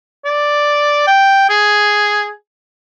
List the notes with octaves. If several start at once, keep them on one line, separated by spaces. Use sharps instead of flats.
D5
G5
G#4